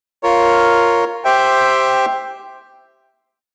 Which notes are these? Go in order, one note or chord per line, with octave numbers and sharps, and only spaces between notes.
F4 A#4 C#5
G4 C5 E5 G5